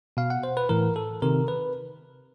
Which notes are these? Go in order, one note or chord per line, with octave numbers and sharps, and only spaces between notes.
B2 F5
F#5
C5
B4
A2 E3 A#4
A4
C3 D#3 A#4
B4